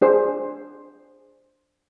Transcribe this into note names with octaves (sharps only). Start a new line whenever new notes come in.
D4 G#4 C5